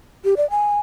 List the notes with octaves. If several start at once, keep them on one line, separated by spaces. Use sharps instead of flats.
G4
D5
G#5